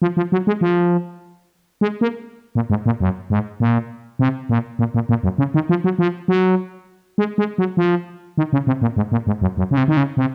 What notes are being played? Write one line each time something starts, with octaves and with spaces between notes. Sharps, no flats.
F3
F3
F#3
G#3
F3
G#3
A#3
A#2
G#2
A#2
F#2
G#2
A#2
C3
A#2
A#2
A#2
A#2
F#2
C#3
D#3
F3
F#3
F3
F#3
G#3
G#3
F#3
F3
D#3
C#3
C3
A#2
G#2
A#2
G#2
F#2
F#2
C#3
C3
D#3
C#3
C3